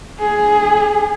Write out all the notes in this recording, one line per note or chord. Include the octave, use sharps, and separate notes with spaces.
G#4 G#5